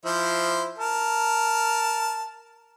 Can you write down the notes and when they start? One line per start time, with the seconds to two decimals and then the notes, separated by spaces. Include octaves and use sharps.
0.05 F3 E4 C5
0.78 A#4 A5